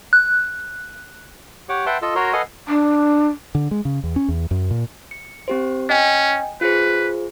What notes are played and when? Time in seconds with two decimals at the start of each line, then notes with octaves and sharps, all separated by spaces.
0.13 F#6
1.69 G4 C#5 F#5 D6
1.86 B4 E5 F#5 G5 A5 C6
2.02 F4 A4 D#5 E6
2.15 F#4 A#4 C#5 A#5 C6
2.33 A4 B4 D#5 F5 F#5 G#5
2.68 D4
3.55 D3
3.71 G#3
3.85 C#3
4.03 E2
4.16 C#4
4.28 E2
4.51 F#2
4.71 A#2
5.11 C#7
5.48 C4 G4 C5
5.90 C#4 D#5 G5 G#5
6.61 F4 G#4 B4 C5